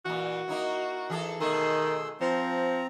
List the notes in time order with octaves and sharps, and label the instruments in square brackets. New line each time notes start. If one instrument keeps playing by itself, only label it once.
[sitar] A#2 E3 [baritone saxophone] F#4
[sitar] A#3 D#4 E4
E3 G#4 A4
[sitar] B2 A3 G#4 [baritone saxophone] D#3 [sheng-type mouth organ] C6 E6
[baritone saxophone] F3 [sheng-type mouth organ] C4 A#5 [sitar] C5